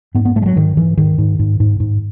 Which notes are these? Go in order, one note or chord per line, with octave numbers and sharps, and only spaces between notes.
G#2 B3
B3
G#2 A3
G#3
F#3
G#2 D#3
G#2 E3
G#2 D#3
G#2
G#2
G#2
G#2